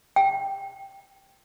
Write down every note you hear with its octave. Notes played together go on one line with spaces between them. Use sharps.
G5